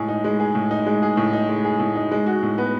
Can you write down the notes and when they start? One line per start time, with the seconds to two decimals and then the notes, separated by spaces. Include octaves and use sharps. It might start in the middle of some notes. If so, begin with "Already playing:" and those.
Already playing: A2 G#3 G#4
0.08 D#4
0.24 G#3
0.40 G#4
0.55 A2
0.71 D#4
0.86 G#3
1.02 G#4
1.17 A2
1.33 D#4
1.49 G#3
1.64 G#4
1.80 A2
1.95 D#4
2.11 G#3
2.26 F#4
2.43 A2
2.58 B3